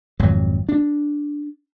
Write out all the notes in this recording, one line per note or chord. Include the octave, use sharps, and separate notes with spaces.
G#1 F2 F#3
D4